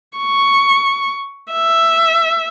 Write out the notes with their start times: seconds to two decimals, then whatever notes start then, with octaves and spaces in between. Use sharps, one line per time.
0.18 C#6
1.52 E5